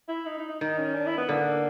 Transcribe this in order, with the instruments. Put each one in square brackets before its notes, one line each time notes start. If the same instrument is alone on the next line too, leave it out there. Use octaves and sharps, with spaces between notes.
[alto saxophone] E4
D#4
D#4
D#4
[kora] D#3 [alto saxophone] D#4
[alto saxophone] C#4
D4
E4
B3
[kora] D3 [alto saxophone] A#3